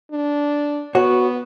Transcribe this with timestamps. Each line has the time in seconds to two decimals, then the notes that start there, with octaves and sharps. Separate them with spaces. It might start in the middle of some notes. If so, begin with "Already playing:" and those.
0.12 D4
0.95 B3 F#4 C#5